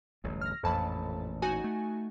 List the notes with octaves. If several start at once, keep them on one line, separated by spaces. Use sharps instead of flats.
D1 A1 G2
F6 A#6
A1 F2 A#2 A5 B5
D#4 F#4 G#5
A3